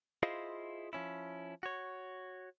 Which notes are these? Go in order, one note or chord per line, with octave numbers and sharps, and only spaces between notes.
E4 F4 G#4 C5 D#5 F5
F3 C#4 E4
F#4 C#5